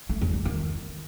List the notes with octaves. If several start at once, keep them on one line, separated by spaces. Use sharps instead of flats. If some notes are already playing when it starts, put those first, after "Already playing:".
A3
E2
A3
D#3